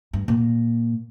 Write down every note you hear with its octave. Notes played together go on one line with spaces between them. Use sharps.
G2
A#2